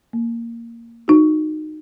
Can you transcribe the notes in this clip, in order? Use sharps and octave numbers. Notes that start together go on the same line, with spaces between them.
A#3
D#4 F#4